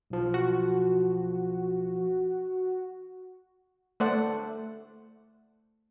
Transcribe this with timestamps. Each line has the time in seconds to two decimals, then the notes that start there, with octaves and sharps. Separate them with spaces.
0.10 B1 F3
0.34 F#4
4.00 A3 C5 D5 F#5